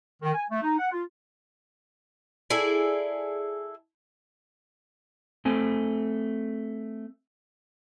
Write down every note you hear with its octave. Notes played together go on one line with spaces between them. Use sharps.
D#3
G#5
A3
D#4
F#5
F4
E4 G#4 A4 D5
A3 C4 G#5